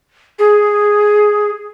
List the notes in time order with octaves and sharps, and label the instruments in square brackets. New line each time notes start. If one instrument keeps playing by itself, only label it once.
[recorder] G#4